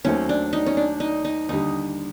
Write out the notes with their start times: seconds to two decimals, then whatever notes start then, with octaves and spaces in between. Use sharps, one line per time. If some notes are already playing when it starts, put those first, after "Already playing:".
0.05 D#2 D#3 F#3 A3 C4 C#4
0.29 D4
0.53 D#4
0.66 C#4
0.77 D4
1.00 D#4
1.25 D#4
1.49 D#2 D3 G3 D#4